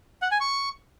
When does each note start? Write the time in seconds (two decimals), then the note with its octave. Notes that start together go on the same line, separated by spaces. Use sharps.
0.22 F#5
0.31 G#5
0.41 C#6